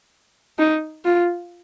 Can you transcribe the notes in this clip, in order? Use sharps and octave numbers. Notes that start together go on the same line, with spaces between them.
D#4
F4